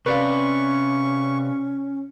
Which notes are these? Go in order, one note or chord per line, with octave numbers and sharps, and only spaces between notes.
C3 C#4 B4 D5 F5 C#6